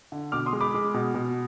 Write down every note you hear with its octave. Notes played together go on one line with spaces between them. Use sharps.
D3
B2 D6 F6
C6 D#6
G#3
B5 D6
G#3
B2
B2